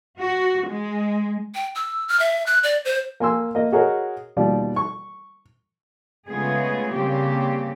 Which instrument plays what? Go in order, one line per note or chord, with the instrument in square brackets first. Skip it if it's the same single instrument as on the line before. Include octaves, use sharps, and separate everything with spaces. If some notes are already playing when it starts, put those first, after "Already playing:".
[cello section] F#4
G#3
[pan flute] G5
E6
F6
E5
F#6
D5
C5
[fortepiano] A#3 G#5 C6 E6
A#3 D#5
F#4 G#4 A#4 C#5 D#5
D#2 B2 G3 F4 D5
C#6
[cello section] C#3 G#3 A3 B3 F4 G#4
C#3 G3 A#3 C4 G4